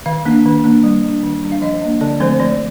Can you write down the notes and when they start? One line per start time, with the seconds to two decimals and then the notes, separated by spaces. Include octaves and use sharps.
0.06 D#3 F5
0.25 A#3 D4
0.46 D#3
0.64 A#3 D4
0.84 G3
1.04 D4
1.23 D#3
1.43 G3 D4
1.52 F5
1.62 F3 D#5
1.82 A#3 D4
2.01 D3 D5
2.20 F3 A3 C4 C5
2.40 F3 D5